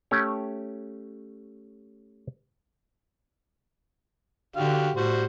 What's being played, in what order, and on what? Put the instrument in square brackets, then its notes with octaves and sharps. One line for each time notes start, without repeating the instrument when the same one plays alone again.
[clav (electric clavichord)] A3 C#4 G4 C#5
[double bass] D3 [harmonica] F#4 G4 F5
[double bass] A2 [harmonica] G3 F#4 C5